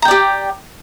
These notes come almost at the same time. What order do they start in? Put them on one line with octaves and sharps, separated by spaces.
A#5 G5 D5 G4